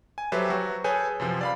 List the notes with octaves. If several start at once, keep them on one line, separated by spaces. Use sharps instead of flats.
G#5
F#3 G4 A4 B4 C5 E5
F#3 F#4
G#4 A4 B4 C#5 G#5 G6
F#2 C3 F3
D5 F5 B5